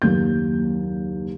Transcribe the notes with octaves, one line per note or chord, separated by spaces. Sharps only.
F#1 D#2 G6